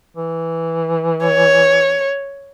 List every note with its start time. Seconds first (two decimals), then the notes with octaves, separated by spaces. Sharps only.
0.16 E3
1.26 C#5